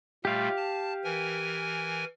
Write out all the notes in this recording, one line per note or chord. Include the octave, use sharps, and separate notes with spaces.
A#2 G3 A3 G4 F5
A5
E3 A#4 G#5